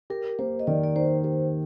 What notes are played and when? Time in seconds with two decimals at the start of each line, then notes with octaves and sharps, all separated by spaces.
0.10 G4 A#4
0.39 A#3 C5
0.60 D#5
0.67 D#3 D5
0.84 D5
0.96 D#4 C5
1.24 G4 C5